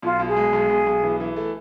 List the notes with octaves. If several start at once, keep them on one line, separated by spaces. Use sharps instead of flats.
B1 F4
B2
G#4
G#3
B1
B1
B1
E3
E3
A3